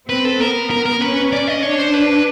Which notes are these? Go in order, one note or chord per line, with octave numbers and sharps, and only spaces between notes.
C4 B4
A4
B3 A#4
A#4
A#4
C#4 B4
D5
D#5
D4 C#5
C5
B4